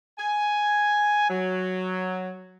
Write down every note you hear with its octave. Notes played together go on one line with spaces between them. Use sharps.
G#5
F#3